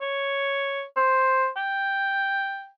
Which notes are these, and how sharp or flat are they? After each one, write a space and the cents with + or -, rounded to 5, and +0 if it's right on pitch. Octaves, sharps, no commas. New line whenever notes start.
C#5 +0
C5 +5
G5 +5